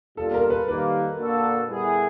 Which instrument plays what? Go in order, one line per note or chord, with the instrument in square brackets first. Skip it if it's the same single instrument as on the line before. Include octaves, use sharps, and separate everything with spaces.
[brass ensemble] B2 G3 A#3 D4 F4 [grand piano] A4
[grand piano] A#4
B4
[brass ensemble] D#3 G3 A#3 [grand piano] B4
[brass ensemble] A#3 D4 F#4 A4
G3 B3 E4 G#4